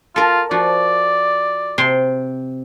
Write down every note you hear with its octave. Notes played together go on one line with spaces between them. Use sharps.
F4 A4 A#4
F3 F#4 D5
C3 C6